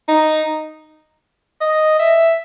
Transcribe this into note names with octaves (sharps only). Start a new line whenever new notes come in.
D#4
D#5
E5